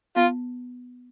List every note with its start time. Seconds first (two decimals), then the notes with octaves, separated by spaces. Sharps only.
0.16 B3 F4